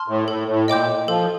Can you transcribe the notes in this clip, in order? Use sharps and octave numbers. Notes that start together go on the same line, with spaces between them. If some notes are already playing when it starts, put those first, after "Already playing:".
Already playing: A5 C6 F6
A2
A2 A4
A2
A#2 D#5 G5 D6 G6
F3 A4